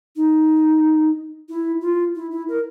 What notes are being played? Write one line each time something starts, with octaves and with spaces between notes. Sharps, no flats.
D#4
E4
F4
E4
E4
A#4